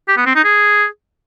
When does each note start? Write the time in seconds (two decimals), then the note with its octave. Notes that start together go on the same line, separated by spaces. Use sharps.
0.08 G4
0.17 B3
0.26 C4
0.35 D#4
0.44 G#4